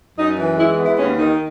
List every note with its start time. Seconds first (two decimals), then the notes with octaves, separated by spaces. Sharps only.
0.16 F#2 D#4
0.36 E3
0.57 G#3 E4
0.78 B3
0.85 E4
0.98 D#2 C#4
1.18 D#3 D#4